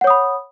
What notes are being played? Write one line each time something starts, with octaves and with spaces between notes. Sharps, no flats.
C#5 F#5 B5 D#6